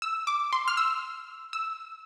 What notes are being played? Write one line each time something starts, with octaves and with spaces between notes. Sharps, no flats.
E6
D6
C6
F6
E6
E6